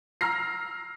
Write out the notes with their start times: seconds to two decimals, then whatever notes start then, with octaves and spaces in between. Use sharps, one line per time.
0.21 A#5 E6 F6 A#6 C7